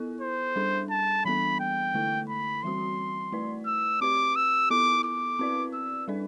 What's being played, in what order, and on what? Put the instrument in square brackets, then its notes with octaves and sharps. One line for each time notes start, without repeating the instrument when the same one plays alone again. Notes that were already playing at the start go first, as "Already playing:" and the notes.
Already playing: [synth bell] B3 E4 A4
[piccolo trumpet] C5
[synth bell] G3 D4 A4
[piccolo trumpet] A5
[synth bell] E3 G3 B3 D4 A4 [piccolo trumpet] B5
[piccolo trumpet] G5
[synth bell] D3 A3 E4 A4
[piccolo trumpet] B5
[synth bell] E3 G3 C4 F#4 [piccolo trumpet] C6
[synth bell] A3 E4 B4 D5
[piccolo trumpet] E6
[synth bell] C4 G4 B4 [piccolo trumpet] D6
[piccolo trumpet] E6
[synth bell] B3 E4 A4 [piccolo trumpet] D6
[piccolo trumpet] D6
[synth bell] C4 E4 B4 D5
[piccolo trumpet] E6
[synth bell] G3 D4 A4 D5